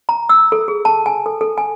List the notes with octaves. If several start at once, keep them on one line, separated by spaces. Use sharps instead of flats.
A#5
E6
A4
G#4
A5
G#5
A4
A4
G#5